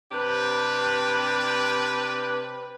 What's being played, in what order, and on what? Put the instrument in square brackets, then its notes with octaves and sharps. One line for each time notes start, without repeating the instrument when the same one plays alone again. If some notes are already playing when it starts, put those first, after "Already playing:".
[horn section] C3 D4 G4 B4